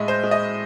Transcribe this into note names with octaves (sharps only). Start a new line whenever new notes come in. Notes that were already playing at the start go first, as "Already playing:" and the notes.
Already playing: A2 G#3 D#5 E5
C5
G#3
D#5